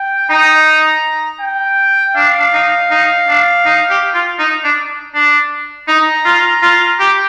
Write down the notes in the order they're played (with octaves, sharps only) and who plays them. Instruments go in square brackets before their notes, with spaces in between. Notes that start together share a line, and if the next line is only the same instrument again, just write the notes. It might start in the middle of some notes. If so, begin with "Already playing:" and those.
Already playing: [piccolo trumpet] G5
[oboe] D#4 [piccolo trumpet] A#5
[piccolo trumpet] G5
[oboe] D4 [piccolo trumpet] F5
[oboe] D4
D#4
D#4
D4
D#4
G4
F4
D#4
D4
D4
[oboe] D#4 [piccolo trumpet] A#5
[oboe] F4
F4
G4